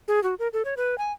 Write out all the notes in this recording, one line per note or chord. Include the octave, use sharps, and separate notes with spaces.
G#4
F#4
A#4
A4
C#5
B4
G#5